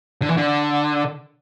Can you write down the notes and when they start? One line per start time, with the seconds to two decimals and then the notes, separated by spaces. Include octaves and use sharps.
0.22 D3
0.29 E3
0.37 D3